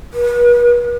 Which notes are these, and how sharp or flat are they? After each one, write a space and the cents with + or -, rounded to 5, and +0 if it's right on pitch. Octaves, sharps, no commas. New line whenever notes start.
B4 -40